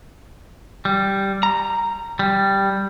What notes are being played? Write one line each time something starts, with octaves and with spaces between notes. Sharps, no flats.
G3
A#5
G3